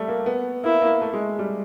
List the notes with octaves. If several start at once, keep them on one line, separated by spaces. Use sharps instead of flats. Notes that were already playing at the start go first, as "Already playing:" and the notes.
Already playing: G3 A3
A#3
B3
A#3 E4
A#3
A3
G#3
G3